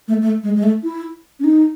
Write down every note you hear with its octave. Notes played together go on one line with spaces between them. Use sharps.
A3
A3
G#3
G#3
A3
E4
C#4
D#4